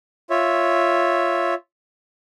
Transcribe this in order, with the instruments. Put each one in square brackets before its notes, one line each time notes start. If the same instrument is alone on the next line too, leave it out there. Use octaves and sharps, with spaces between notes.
[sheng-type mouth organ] F4 C#5 E5